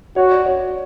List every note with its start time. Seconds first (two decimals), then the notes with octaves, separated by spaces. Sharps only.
0.16 F#4 C#5
0.32 D5
0.46 C#5